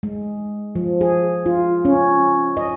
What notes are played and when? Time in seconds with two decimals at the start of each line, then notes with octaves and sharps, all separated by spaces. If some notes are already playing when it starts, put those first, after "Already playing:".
0.03 G#3
0.75 F3
1.01 G#4
1.46 F4
1.85 C#4
2.57 D#5